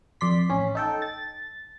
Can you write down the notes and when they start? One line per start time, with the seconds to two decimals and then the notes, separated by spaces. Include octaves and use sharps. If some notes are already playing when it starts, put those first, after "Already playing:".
0.21 F2 D5 C6 B6
0.50 A1 C#4
0.75 D#4 A4 G5
1.02 A6